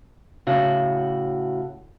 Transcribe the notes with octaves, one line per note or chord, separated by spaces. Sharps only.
A2 C#3 F#4